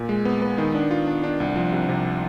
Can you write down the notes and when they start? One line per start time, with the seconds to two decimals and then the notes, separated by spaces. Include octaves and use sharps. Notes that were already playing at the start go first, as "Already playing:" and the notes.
Already playing: A#2
0.09 G#3
0.25 B3
0.42 B3
0.58 D#3
0.75 D4
0.91 F4
1.07 D4
1.23 D4
1.40 C2
1.56 F3
1.72 C3
1.89 C3